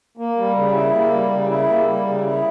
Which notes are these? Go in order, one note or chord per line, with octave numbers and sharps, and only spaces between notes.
A#3
G3
C#3
E4
A#3
G3
C#3
E4
A#3
G3
C#3
E4